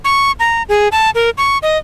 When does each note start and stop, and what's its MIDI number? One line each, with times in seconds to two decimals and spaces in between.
0.04 0.32 85
0.40 0.63 82
0.69 0.88 68
0.92 1.10 81
1.15 1.30 70
1.38 1.58 85
1.63 1.78 75